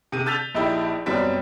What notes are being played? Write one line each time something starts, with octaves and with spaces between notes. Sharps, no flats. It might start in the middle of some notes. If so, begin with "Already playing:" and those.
C3 D#7
E6 G6 A6 B6 F7
A#1 D#4 E4 G4
F#2 B2 G3 C4 B6